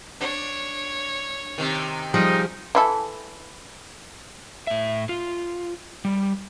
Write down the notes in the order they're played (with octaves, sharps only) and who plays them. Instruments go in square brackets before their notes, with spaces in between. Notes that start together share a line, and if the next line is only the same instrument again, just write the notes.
[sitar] D4 [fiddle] C#5
[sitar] C3 D#3
[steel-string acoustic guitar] F3 G3 G#4 [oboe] D#4
[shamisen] E3 E4 A4
[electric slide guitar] A2 E5
F4
G3